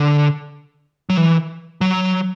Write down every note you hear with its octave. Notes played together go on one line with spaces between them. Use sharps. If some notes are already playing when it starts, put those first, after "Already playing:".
Already playing: D3
F#3
E3
F#3